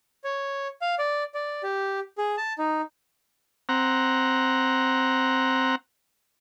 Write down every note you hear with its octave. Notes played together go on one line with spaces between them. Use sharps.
C#5
F5
D5
D5
G4
G#4
A5
D#4
C4 F#5 A#5